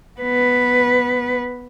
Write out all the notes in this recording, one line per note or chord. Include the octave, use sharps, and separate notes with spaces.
B3 B4